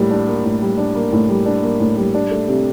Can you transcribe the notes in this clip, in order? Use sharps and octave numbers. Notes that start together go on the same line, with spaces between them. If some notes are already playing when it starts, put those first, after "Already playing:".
Already playing: A2 G3 A#3 D4
D4
A#3
A2
G3
D4
A#3
A2
G3
D4
A#3
A2
G3
D4
A3
C3